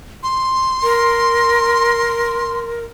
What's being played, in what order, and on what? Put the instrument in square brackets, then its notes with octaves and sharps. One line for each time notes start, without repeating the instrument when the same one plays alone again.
[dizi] C6
[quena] A#4